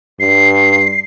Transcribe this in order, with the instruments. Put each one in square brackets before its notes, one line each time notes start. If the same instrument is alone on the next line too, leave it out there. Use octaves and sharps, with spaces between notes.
[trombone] G2 [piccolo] C7